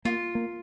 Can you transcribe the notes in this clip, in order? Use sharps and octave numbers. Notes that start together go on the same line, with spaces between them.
A#3 F4
A#3